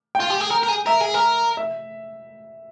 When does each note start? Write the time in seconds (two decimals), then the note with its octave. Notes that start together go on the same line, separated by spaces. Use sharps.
0.15 G5
0.20 F4
0.30 G4
0.41 G#4
0.51 A#4
0.63 A#4
0.69 G#4
0.86 A#4 E5
1.01 G#4
1.14 A#4
1.57 E5